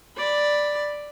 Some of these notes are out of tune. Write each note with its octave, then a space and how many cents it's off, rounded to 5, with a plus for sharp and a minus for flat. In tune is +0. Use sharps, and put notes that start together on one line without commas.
D5 +5 B5 +0